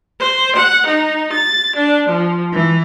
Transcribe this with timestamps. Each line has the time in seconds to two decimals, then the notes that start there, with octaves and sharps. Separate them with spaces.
0.19 C5
0.56 F#5
0.87 D#4
1.33 A6
1.76 D4
2.08 F3
2.53 E3